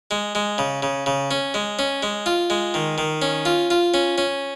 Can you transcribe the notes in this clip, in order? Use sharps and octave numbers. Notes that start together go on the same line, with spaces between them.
G#3
G#3
C#3
C#3
C#3
C#4
G#3
C#4
G#3
F4
G#3
D#3
D#3
C#4
F4
F4
C#4
C#4